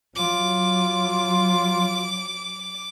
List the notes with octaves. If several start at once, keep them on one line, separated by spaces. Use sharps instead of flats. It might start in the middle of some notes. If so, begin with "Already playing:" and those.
F#3 F4 D6